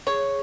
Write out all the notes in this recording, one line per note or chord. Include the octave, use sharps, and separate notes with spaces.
G#4 C#5